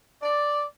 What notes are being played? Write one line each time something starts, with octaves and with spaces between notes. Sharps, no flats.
D5